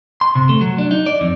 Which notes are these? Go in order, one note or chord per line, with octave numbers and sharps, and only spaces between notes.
C6
C3
A3
F#3
D4
D#4
D5
F2